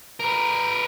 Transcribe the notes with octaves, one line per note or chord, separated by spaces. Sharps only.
A#4 B4